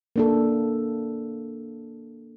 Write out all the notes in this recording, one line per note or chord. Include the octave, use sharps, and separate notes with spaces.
A#3 D4 A4